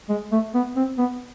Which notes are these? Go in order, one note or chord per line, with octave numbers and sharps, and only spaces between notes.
G#3
A3
B3
C4
B3